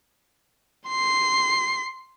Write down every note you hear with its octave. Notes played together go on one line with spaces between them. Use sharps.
C6 C7